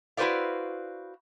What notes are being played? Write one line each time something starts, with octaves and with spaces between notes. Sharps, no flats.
E4 F#4 B4 C5 D5 F5